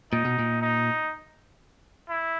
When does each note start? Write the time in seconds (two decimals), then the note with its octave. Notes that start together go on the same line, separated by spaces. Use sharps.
0.13 A#2 D#4
0.25 B2
0.39 A#2
0.62 D#4
2.09 E4